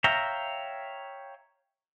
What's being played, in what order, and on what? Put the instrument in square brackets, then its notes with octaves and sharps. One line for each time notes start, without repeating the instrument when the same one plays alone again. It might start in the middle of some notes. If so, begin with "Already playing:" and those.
[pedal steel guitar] C#5 E5 F5 G5 A#5